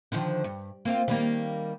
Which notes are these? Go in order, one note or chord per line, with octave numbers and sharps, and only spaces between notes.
D3 D#3 F3
G2
A#3 C4 F4
D#3 G3 A#3